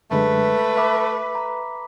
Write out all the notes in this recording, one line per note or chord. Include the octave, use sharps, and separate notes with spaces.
F#2 D3 G#3 A3 B4
E5 B5 D6 B6
A#5